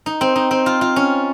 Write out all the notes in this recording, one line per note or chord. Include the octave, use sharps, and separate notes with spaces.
D#4
C4
D#4
C4
F4
F4
C#4